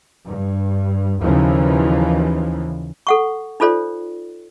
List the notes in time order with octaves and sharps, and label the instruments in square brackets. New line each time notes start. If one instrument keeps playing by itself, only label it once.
[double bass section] G2
D#2 C#3 E3 F3
[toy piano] A4 F#5 C#6
D#4 F4 A4 C5 D5